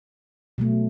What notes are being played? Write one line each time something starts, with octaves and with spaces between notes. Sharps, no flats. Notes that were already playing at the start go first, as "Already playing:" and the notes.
B2 F#3 A3